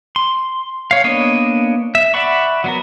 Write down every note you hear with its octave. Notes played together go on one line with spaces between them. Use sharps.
C6
C#5 F5
A#3 B3 D4 C#5 D#5
E5
D5 E5 F#5 B5 C#6
F#3 B3 A#4